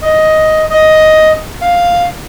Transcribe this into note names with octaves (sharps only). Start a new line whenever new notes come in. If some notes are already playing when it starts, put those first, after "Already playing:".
D#5
D#5
F5